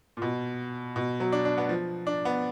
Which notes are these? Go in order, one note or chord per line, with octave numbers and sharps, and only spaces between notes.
A#2
B2
B2
F#3
D4
D4
B3
F3
D4
B3